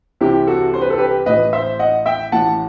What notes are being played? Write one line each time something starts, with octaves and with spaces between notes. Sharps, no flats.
C2 C3 E3 E4 G4
F#4 A4
C5
B4
A4
G4 B4
A1 A2 E3 B4 D#5
C5 E5
D#5 F#5
E5 G5
A1 A2 E3 F#5 A5